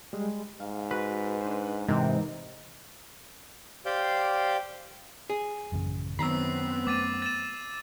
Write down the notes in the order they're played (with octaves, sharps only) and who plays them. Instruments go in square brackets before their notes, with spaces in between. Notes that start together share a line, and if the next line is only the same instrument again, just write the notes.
[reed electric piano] G3 G#3
[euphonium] G#2 [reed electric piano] F5
[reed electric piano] F#4 [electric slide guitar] B4
[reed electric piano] D4 C5
[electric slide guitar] G#2 E3 C4 [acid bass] C3 [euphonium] D#4 [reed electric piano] A#4
[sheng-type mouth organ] G4 C5 D5 F5 G5
[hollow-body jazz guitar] G#4
[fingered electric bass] A1 F#2 C#3
[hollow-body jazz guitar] F#2 A#5 B5 [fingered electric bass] D#3 [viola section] B3 C4 [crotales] E6 C7
[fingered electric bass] A3 [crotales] D6 A6 D#7
[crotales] A6 E7